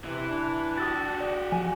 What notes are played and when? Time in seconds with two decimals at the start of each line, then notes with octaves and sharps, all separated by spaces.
0.05 C3 E3
0.30 D4
0.77 F#4 G4 D#6 E6 A6
1.20 D5
1.52 F3 G#5